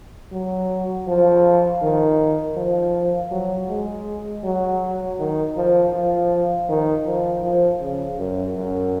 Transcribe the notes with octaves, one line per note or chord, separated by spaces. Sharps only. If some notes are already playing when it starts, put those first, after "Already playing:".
F#3
F3
D#3
F3
F#3
G#3
F#3
D#3
F3
F3
D#3
F3
F3
C#3
F#2
F#2